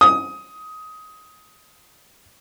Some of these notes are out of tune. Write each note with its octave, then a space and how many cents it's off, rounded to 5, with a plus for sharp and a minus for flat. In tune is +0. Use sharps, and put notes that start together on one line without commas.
D#6 +15